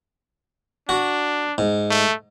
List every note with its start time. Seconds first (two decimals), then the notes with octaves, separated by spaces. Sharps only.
0.89 D4 F#4
1.58 G#2
1.90 A3